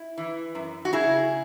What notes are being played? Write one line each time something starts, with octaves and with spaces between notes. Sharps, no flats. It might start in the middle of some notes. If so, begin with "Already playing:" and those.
Already playing: E4
E3
F#2
F#4
C#3 E4 G#4